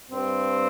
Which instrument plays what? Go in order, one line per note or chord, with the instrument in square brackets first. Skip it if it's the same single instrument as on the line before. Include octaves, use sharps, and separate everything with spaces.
[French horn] G2 [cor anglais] C4